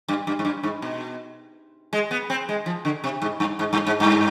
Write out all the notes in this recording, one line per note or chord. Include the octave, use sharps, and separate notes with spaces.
G2
G2
G#2
G2
G#2
B2
G#3
B3
C4
G#3
F3
D3
C3
G#2
G2
G#2
G2
G#2
G2